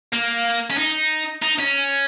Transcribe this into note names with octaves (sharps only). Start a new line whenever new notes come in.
A#3
C#4
D#4
D#4
C#4